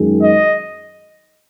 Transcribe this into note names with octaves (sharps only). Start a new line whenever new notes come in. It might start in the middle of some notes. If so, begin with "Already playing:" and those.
Already playing: F#2 D#3 G#3
D#5